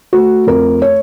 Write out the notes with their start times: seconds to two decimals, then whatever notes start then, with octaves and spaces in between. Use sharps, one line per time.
0.13 A3 F#4
0.47 F2 A#4
0.82 C#5